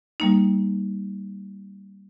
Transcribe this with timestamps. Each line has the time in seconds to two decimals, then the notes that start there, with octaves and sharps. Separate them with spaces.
0.20 G3 A#3 D#4